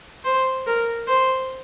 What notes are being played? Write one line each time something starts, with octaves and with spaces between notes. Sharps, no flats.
C5
A#4
C5